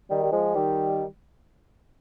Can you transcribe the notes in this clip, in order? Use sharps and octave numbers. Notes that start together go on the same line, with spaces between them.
D#3 G3
G3
F3 G#3
D#3 G3